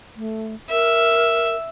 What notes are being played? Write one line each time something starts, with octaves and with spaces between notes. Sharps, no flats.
A3
A#4 E5